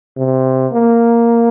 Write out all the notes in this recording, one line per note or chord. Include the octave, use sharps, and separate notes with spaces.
C3
A#3